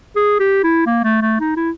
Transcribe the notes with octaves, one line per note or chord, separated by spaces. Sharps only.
G#4
G4
E4
A#3
A3
A3
D#4
E4